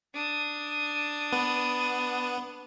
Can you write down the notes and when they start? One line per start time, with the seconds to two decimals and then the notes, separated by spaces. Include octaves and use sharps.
0.14 D4 D#6
1.33 B3